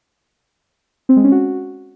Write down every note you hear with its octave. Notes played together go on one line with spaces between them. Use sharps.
C4
G#3
C#4
F#4